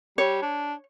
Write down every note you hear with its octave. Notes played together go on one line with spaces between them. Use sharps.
G3 C#5
D4